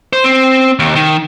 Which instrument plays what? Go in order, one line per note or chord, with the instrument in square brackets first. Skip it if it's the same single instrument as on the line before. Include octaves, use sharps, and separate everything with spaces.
[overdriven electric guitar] C5
C4
D#2
D#3